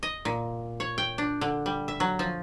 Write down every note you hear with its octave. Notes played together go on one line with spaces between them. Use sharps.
D#5
A#2
C#5
G5
D4
D3
G3
E5
F#3
F3